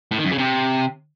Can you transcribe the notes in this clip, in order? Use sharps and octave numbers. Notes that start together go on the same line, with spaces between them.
A2
D#3
F#2
C#3
C3